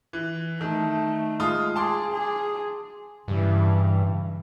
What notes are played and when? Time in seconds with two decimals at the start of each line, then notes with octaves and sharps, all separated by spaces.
0.13 E3
0.61 D#3 A3
1.40 G#3 F4 D#6
1.76 G#4 A5 C6 D6
2.12 G#4
3.28 G2 C#3 E3